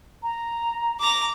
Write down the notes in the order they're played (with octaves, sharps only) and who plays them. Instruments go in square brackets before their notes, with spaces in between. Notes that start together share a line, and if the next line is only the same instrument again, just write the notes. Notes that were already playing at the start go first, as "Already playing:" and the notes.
[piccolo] A#5
[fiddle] A#5 D6